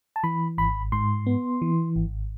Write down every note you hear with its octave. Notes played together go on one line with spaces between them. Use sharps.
A5
E3 B5
G#1 B5
G#2 C6
B3
E3
G#1